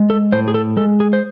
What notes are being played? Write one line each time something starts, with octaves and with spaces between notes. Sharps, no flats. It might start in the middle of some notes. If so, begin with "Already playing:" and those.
Already playing: G#3
A4
A2 C5
G#4
A4
G#3 A4
G#4
C5